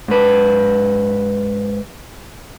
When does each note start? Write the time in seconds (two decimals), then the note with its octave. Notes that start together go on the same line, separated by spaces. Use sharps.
0.08 G#2 B4